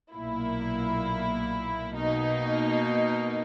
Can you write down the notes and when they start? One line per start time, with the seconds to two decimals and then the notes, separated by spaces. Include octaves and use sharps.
0.14 B1 A#2 A#3 E4
1.95 B2 A#3 D#4